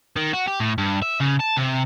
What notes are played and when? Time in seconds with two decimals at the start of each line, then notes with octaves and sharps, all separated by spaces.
0.16 D#3
0.33 F#4
0.47 G4
0.60 A2
0.78 G2
1.03 E5
1.21 C#3
1.40 A5
1.57 C3